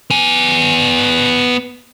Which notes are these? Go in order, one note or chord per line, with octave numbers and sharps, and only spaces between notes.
B3 G#5